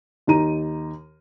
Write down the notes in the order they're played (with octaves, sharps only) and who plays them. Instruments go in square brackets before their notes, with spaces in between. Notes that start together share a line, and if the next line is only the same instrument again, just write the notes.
[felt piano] D#2 D#4 A#5 D#7